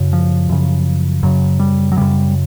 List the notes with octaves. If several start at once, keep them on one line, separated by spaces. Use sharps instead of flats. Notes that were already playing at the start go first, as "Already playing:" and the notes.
Already playing: F#2 C#3
F3
F#2 C#3
F#2 C#3 F#3
G3
F#3
F#2 C#3 G3